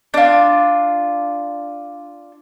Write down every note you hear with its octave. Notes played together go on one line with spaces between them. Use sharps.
D4 F4